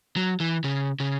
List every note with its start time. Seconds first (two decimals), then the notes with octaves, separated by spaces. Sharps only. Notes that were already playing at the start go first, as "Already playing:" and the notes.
0.16 F#3
0.40 E3
0.64 C#3
1.00 C#3